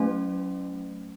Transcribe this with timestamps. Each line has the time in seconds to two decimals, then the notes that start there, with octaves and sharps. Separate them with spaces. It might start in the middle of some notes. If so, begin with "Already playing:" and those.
Already playing: F#3 A3 C#4